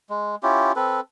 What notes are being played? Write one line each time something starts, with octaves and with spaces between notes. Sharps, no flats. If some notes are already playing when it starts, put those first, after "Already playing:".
G#3
C#4 E4 F4 G4
C4 A4 B4